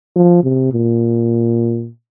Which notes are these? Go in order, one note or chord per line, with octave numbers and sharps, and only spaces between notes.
F3
C3
A#2